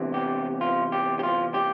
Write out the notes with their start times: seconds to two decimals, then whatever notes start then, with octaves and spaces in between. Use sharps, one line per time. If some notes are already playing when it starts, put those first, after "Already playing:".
Already playing: E2 C3 E3
0.14 G4
0.61 F4
0.92 G4
1.19 G4
1.23 F4
1.54 G4